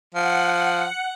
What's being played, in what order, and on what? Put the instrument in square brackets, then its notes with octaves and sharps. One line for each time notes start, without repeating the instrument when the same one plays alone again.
[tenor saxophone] F3 [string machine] F#5